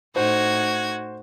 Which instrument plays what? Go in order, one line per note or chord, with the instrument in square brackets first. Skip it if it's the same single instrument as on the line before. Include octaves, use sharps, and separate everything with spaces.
[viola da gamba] A2 D#4 [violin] F#4 G#6 [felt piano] C5